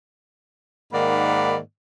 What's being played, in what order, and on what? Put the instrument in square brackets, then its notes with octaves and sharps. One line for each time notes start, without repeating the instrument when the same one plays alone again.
[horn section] G#2 D#3 A#3 D5 F#5 B5